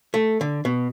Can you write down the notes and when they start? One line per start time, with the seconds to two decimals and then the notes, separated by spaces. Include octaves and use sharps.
0.14 A3
0.41 D3
0.65 B2